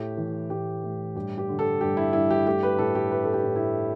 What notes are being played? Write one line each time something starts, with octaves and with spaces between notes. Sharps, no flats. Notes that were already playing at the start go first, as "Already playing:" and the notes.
Already playing: A2 A3 G4
E3
A2 G4
A2
G2 G4
G4
D3
A4
G2 G4
E4
G2 E4
G4
A3 G4
B4
A2 A4
G4
A3 B4
A4
G4
A2
E4